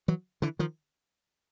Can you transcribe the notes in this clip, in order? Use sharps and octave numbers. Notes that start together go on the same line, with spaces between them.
E3 F#3
D3 E3
D#3 F3